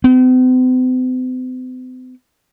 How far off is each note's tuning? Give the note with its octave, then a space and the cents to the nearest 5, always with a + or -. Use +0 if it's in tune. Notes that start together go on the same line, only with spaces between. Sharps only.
C4 -45